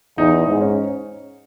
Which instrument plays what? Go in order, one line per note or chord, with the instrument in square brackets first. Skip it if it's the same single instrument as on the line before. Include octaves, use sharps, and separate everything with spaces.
[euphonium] E2 [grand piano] D#4
[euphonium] G#2 [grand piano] D#4
[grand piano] C#4